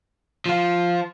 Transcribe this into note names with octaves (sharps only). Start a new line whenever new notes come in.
F3 F4